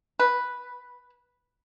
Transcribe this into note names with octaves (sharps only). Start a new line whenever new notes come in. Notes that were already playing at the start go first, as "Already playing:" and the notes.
B4